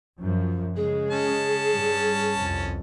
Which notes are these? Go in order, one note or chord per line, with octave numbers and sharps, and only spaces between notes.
F#2 F3
C#3 G#3 G#4
C#4 A5
G2 G3
C2 F2